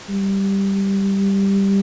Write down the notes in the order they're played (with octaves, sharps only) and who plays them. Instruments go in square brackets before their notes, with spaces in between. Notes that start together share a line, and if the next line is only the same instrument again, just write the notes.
[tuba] G3